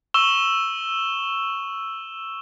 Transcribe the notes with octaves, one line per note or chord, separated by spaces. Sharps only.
C#6 E6 E7 G7